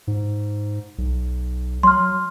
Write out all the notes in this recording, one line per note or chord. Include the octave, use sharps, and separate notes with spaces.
G#2
B1
F#3 C6 F6